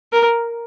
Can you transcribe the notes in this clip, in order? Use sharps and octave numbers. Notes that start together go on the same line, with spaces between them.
A#4